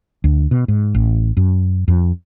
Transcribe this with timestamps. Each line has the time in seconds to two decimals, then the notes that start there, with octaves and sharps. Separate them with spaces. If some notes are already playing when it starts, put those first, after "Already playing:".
0.24 D2
0.51 B2
0.68 G#2
0.95 A1
1.37 F#2
1.88 F2